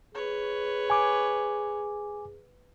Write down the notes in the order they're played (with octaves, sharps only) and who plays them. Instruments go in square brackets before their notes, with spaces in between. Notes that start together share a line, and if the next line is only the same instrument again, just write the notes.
[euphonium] G#4 [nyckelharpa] B4 C#5
[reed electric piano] G#5 D6